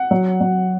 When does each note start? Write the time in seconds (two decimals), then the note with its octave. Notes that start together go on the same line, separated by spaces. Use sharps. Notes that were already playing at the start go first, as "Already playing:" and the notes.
Already playing: F#5
0.11 F#3
0.41 F#3